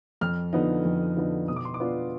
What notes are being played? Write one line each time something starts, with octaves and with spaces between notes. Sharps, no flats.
F2 F6
D3 F3 B3 D#4
F2
D3 F3 B3 D#4
B2 D#6
D6
C6
D6
B3 D4 F4